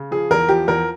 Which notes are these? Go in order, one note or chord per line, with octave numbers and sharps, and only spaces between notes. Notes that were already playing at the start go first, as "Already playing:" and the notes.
Already playing: C#3
F3 G#4
E2 A#4
F3 G4
E2 A#4